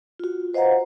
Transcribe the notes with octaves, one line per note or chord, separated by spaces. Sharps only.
F4 F#4
B4 C5 D#5 F5 F#5 A#5